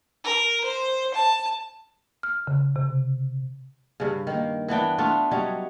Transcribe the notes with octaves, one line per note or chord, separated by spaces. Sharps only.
A#4
C5
A5
F6
C#3
C3
G2 C#3
D#3 A#3
E3 B3 D4 G5
A3 B3 D4 F4
F#3 G3 C#4 D#4